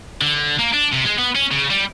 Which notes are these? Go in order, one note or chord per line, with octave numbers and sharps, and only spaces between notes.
D3
A#3
D4
C3
G#3
B3
C#4
C#3
G3